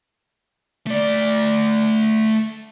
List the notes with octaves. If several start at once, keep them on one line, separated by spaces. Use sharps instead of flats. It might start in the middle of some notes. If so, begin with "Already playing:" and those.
A3 D5